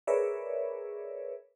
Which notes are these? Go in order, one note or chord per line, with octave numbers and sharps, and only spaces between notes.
G#4 A#4 B4 C#5 D5 E5